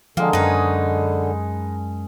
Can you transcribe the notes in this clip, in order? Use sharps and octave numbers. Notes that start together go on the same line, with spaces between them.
D3 D#3 F3 G#3 A#3 A5
F#2 C#4 D#4 G#4 B4